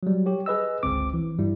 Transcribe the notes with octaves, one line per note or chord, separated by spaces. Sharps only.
F#3 G3
G4 C#5
G#4 B4 D#5 E6
G1 C#2 C4 D6
E3
G2 G3 E4